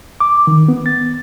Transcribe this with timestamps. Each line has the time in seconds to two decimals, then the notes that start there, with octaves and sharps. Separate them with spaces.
0.20 D6
0.47 D#3
0.68 B3
0.86 A6